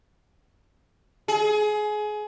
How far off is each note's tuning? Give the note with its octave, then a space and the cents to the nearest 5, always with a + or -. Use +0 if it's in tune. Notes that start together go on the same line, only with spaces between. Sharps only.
G#4 +25